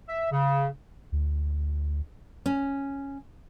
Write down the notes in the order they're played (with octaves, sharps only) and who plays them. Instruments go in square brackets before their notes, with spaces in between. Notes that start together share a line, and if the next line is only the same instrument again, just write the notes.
[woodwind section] E5
C#3
[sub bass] D2
[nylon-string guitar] C#4